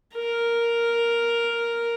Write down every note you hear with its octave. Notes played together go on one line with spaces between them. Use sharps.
A#4